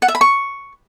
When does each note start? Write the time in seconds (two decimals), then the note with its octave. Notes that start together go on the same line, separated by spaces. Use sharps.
0.02 F#5
0.08 E5
0.15 B5
0.21 C#6